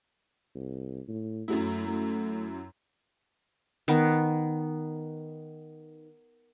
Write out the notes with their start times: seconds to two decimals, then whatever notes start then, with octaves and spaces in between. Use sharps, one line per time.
0.55 C2
1.08 A2
1.48 F#2 F#3 A3 E4
1.88 A3
3.88 D#3 B3